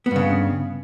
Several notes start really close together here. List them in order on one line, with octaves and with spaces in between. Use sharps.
B3 G2 C#3